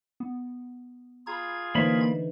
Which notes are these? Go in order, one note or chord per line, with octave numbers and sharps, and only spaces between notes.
B3
F4 G#4 A#5 B5 G#6
D3 E3 A#3 D#4 C5 D5 E5 B5